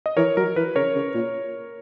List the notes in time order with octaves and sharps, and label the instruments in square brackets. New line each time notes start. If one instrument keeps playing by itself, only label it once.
[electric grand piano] D#5
[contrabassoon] E3 [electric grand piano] A#4 C#5
[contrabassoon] F#3 [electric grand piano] A#4
[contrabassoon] E3 [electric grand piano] B4
[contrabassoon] C#3 [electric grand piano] A#4 C#5
[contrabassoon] C#3
A#2